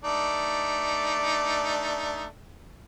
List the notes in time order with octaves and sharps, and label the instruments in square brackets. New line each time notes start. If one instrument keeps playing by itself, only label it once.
[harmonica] A3 D4 D#4 [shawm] D6